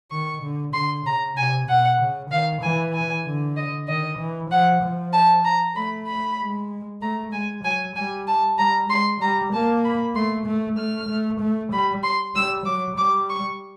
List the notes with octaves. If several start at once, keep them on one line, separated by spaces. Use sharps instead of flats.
D#3 C#6
D3
D3 C6
C#3 A#5
C3 G#5
B2 F#5
C#3
D#3 F5
E3 G#5
G#5
D3
D#5
D#3 D#5
E3
F3 F#5
F3
A5
A#5
A3 B5
B5
G#3
A3 A#5
G#3 G#5
F#3 G#5
G3 G#5
A5
G3 A#5
G#3 C6
G3 A#5
A#3 A5
B5
A3 C6
A3
A3 F6
A3
A3
G3 B5
C6
G3 E6
F#3 D6
G3 D6
C#6